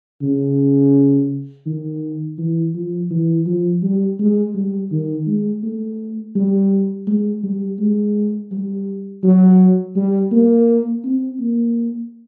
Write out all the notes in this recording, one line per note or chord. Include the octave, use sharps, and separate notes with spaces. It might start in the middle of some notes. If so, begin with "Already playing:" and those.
C#3
D#3
E3
F3
E3
F3
G3
G#3
G3
D#3
G#3
A3
G3
G#3
G3
G#3
G3
F#3
G3
A#3
C4
A#3